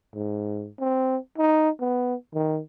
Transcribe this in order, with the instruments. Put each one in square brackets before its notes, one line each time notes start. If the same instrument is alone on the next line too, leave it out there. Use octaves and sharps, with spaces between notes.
[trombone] G#2
C4
D#4
B3
D#3